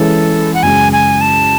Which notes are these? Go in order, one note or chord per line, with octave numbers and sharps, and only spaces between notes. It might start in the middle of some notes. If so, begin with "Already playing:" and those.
Already playing: E3 G#3 C#4 E4 A4
F#5
F#2 C#3 G#3 G#5
G#5
A5